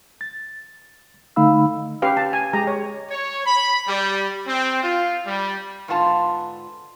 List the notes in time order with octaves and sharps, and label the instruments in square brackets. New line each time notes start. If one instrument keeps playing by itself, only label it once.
[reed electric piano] A6
D3 A3 D#4 F5 B5 E6
[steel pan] C#4 G4 B4 F5
A5
G#5
G#3 G4 A#5
C#5
[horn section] C#5
B5
G3
C4
F4
G3
[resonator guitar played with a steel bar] G#2 D3 B3 F4 G#5 A5